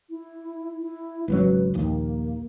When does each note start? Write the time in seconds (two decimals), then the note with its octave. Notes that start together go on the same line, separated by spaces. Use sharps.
0.10 E4
0.82 E4
1.28 G#1 C#2 F#3 B4
1.74 A#1 D#2 A#3